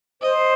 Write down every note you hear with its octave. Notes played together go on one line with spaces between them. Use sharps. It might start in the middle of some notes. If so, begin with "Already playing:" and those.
C5 D#5